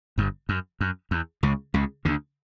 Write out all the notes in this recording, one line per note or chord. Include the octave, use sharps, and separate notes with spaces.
G1 G2
F#2
F#2
E2
C#2 C#3
C#2 C#3
D2 D3